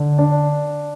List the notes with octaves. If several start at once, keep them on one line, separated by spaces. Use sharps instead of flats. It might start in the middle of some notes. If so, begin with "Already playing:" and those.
Already playing: D3
D4